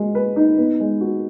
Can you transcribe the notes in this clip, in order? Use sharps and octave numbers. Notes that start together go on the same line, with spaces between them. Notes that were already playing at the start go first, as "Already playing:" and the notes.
Already playing: G#3 F#4
B4
D#4
B3
G#3
F#4